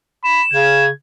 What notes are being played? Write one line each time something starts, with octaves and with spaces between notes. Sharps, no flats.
B5 E7
C#3 G#6